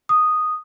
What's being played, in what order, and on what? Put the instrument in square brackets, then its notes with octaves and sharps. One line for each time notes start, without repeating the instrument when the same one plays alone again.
[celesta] D#6